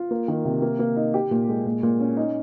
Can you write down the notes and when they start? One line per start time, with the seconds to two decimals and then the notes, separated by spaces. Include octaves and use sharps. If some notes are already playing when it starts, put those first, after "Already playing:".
Already playing: F4
0.11 A#3
0.28 D#3
0.45 C3
0.62 A#3
0.79 A#3
0.97 D#4
1.14 G4
1.31 A#2
1.49 G#3
1.65 A#2
1.83 A#2
2.00 C#4
2.17 D#4